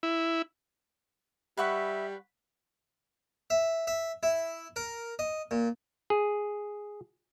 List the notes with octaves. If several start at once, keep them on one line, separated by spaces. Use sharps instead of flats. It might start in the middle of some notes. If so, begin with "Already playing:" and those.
E4
G3 B4 E5 F#5 C#6
E5
E5
E4
A#4
D#5
A#2
G#4